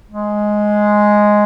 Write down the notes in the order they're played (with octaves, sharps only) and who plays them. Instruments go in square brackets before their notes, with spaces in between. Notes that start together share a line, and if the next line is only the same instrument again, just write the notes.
[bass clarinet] G#3